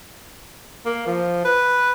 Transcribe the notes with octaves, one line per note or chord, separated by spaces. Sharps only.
A#3
F3
B4